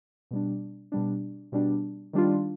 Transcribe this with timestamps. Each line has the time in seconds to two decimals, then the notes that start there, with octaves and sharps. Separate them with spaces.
0.31 B2 G3 D4
0.92 B2 G3 D4
1.52 B2 G3 D4
2.13 D#3 G3 D4 F4